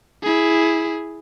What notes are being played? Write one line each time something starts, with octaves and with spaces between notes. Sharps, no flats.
E4 G#4